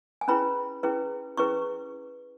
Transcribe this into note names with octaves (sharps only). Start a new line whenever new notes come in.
G#5
C#4 E4 G#4 B4 B5
C#4 E4 G#4 B4
C#4 E4 G#4 B4 C#6